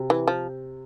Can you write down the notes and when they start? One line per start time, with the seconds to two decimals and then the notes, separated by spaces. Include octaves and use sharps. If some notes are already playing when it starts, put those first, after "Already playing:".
Already playing: C3
0.10 E3
0.28 F3